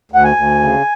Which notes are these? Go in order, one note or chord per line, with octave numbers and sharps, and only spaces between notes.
D2 F#5
G#5
D2
C#3